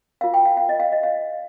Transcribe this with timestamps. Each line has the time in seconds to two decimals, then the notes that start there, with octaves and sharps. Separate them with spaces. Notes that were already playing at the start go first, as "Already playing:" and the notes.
0.21 F4 A#4 F5
0.34 G5
0.45 F5
0.57 F5
0.69 D#5
0.80 F5
0.92 D#5
1.03 F5